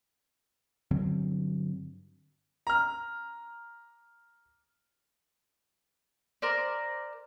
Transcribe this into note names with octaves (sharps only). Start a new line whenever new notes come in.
G2 D3 F#3 C4
A#5 F6
A#4 C5 D5